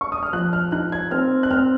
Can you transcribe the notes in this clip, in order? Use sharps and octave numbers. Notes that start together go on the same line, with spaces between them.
C#6
D#6
F6
F3 F#6
F6
D#4 F#6
G#6
C4 F6
F#6
C4 F6